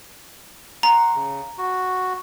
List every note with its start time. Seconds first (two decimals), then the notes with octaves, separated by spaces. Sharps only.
0.83 F#5 A#5 C6
1.15 C#3
1.58 F#4